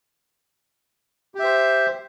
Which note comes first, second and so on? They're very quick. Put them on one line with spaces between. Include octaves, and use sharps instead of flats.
G4 E5 C5